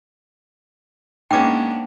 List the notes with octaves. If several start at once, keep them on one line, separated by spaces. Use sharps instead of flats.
G#2 A#3 B3 C#4 D4 G5 D6